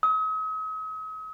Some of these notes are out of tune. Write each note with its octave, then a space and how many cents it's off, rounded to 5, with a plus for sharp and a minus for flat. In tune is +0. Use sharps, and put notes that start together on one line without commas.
D#6 +45